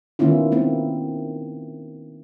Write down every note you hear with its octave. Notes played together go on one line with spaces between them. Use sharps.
D#3 A#3 B3 C#4 E4 F4
A#3 C4 E4